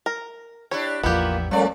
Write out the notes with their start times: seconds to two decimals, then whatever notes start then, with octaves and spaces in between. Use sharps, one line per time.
0.06 A#4
0.71 D4 E4 G4 C#5
1.03 A1 E2 F3 A#3 B3 E4 F4 G4
1.51 F3 G3 A3 A#3 C#4 D5